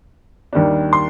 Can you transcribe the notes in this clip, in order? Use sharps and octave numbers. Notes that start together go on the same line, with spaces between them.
D#2 D#3 G3 D4
C6